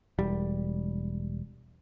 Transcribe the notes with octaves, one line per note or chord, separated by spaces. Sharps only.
E1 G3